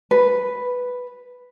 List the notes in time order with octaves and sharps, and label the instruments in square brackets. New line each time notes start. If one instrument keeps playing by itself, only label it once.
[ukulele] B4